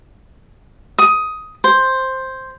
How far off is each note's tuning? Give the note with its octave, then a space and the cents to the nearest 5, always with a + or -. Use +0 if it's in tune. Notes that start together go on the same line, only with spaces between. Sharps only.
D#6 +15
C5 +5